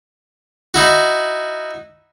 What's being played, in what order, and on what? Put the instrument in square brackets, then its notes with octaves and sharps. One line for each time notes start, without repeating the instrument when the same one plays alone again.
[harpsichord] D#4 E4 F#4